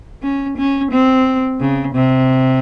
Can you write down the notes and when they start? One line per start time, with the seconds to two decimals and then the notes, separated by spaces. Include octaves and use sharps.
0.22 C#4
0.57 C#4
0.91 C4
1.60 C#3
1.95 C3